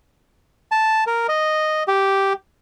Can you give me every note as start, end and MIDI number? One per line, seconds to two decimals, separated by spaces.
0.72 1.04 81
1.07 1.27 70
1.29 1.83 75
1.88 2.33 67